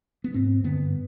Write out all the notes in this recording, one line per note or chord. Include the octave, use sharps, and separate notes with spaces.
B3
G#2 C4
G2 D3 B3